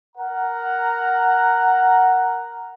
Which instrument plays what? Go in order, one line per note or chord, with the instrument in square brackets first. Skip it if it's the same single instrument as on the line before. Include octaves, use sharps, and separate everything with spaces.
[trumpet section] A#4 F#5 A#5